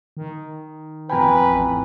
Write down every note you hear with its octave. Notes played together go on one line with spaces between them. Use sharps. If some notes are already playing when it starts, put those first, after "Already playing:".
D#3
F2 B4 G5 G#5 A#5 B5
A1